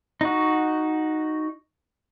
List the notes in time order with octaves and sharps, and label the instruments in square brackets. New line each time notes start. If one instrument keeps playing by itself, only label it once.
[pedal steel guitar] D#4 F#4